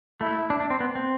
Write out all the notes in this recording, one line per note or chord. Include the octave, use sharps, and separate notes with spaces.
A3 E4
D4
D4
C4
B3
C4